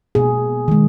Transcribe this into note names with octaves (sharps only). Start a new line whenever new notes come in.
B2 A#3 G#4
D#3 G#3